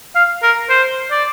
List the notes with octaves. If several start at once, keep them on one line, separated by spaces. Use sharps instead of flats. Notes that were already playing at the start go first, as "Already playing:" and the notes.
F5
A#4
C5
D5